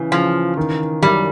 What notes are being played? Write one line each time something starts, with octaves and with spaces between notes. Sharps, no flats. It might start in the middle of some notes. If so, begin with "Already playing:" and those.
Already playing: C#3 E3
C#3 F3
D#3
F#2 G3